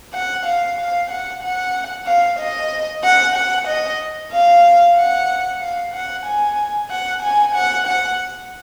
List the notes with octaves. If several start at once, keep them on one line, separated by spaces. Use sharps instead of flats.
F#5
F5
F5
F#5
F#5
F5
D#5
F#5
F#5
D#5
F5
F#5
F5
F#5
G#5
F#5
G#5
F#5
F#5